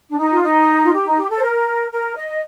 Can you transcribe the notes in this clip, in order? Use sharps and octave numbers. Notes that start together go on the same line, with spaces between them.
D4
D#4
F4
D#4
F4
G4
D#4
G4
A4
C5
A#4
A#4
D#5